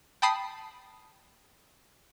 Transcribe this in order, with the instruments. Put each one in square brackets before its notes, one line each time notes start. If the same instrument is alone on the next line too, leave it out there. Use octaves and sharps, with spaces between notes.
[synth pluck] G5 A5 B5 D#6 B6 C7